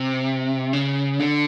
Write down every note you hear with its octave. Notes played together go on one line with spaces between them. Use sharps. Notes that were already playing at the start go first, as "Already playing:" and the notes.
Already playing: C3
C#3
D3